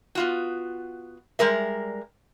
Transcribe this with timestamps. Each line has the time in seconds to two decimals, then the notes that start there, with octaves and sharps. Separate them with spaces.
0.15 B3 F4 F#4
1.39 G3 G#3 A#4 E5